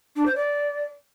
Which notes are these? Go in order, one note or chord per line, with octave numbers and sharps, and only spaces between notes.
D4
C5
D5